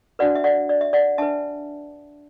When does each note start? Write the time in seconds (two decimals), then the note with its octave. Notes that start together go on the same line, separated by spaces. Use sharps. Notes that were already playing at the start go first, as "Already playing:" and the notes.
0.19 D4 F#4 B4 D5 F#5
0.35 E5
0.44 D5 F#5
0.69 D5
0.81 E5
0.93 D5 F#5
1.18 D4 B4 E5 A5